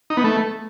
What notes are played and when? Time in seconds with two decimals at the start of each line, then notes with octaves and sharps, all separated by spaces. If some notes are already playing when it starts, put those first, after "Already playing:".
0.10 D#4
0.17 B3
0.24 A3